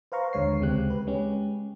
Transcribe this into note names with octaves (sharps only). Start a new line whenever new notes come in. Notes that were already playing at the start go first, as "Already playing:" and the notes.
B4 C5 F5 A#5 C#6
D#2 D3 G#3 C#5 C7
D2 C#3 G#3 C4 G4 F#6
B4
G#3 C#4 G4